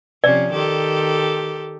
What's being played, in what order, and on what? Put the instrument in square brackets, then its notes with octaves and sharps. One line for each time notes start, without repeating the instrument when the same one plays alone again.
[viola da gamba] C3 F3 C#4 [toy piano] D5
[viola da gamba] D#3 G4 A4